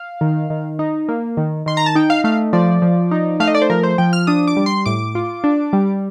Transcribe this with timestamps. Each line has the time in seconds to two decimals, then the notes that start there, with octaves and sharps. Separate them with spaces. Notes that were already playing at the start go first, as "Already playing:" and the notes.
Already playing: F5
0.21 D#3
0.50 D#3
0.79 D#4
1.09 A#3
1.37 D#3
1.66 D#3 C6
1.77 A#5
1.86 A5
1.95 D#4 G5
2.10 F5
2.24 A3 F5
2.53 F3 D5
2.82 F3
3.11 D#4
3.40 A3 F5
3.47 D#5
3.55 D5
3.62 C5
3.70 F3 A#4
3.83 C5
3.98 F3 G5
4.13 F6
4.27 D4 D#6
4.47 D6
4.56 G3
4.66 C6
4.86 A2 D6
5.15 F4
5.44 D4
5.73 G3